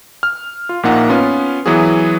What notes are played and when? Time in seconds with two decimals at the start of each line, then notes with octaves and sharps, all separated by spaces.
0.23 F6
0.69 F4
0.83 A#1 A#2 A#3 D#4 F#5
1.09 B3 C#4 F4
1.66 E3 F#3 B3 F#4 G#4